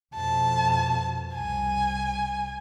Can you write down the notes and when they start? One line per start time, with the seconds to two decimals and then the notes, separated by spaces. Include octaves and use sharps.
0.15 F2 B2 A5
1.35 C2 G#5